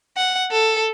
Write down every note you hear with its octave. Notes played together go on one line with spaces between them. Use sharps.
F#5
A4